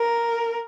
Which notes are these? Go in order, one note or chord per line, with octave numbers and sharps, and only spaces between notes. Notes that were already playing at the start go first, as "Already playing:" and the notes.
Already playing: A#4